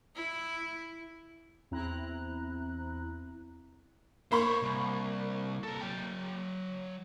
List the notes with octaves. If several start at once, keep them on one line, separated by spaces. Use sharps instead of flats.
E4
E2 C4 E4 A#5 F#6
A#3 C5 C#5 B5 C#6
C2
A4 A#4
F#3 G5